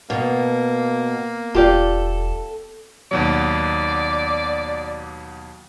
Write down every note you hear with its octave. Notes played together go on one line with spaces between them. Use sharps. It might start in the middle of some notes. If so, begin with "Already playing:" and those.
B2 A#3
E1 F4 G4 A4 D5
D#2 B2 F#3 D5